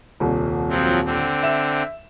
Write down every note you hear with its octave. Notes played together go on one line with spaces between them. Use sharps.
D#1 C2
F3 F#3 C4
D3 C4
E5 E7